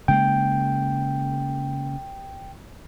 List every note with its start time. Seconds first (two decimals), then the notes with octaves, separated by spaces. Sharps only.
0.08 C#3 G#3 A#3 G5